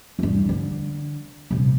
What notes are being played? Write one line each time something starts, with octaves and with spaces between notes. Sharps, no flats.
E2 G2
D3
D#1 C3